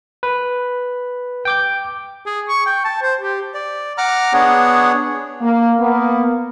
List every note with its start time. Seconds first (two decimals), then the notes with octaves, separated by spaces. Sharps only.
0.23 B4
1.45 G5 D6 G6
2.26 G#4
2.48 C#6
2.66 G5
2.84 A5
3.02 C5
3.21 G4
3.54 D5
3.98 F#5 A#5 D6 F6
4.33 B3 D4 G#4 C#5 F#5
5.41 A#3
5.79 A#3 B3